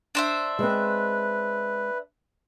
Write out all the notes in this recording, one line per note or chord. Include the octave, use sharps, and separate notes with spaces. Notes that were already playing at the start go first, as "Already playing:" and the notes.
D4 C5 E5
G#3 C4 B4